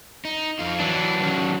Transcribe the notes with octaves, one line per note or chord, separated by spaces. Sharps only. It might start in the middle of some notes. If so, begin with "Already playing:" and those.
D#4
F2 F4
E3 F#3 D4
D#3 C#4